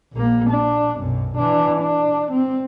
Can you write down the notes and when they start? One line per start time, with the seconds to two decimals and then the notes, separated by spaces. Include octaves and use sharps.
0.13 A#1 A#3
0.50 D4
1.00 B1 F#2
1.38 E3 D4
1.81 D4
2.32 C4